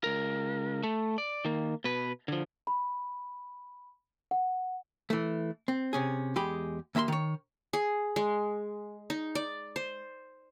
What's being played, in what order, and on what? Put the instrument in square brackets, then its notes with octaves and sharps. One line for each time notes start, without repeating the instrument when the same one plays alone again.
[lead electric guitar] C#2 A#4
A3
D5
D#3 A#3
B2 B4
D3 F3
[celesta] B5
F#5
[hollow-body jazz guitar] E3 A3
C4
C3 C#4 G#4
E2 G#3 G4 B5
D#2 A#3 E5 B5 C6
D#3 C#5
[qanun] G#4
G#3
D#4
D5
C5